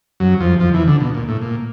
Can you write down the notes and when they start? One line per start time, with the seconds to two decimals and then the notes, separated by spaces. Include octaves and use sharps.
0.20 F#2 F#3
0.40 F2 F3
0.60 F2 F3
0.74 E2 E3
0.87 D2 D3
1.00 B2
1.14 A#2
1.28 A2
1.42 A#2